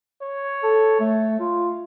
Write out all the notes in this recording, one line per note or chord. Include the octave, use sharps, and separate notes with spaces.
C#5
A4
A3
F4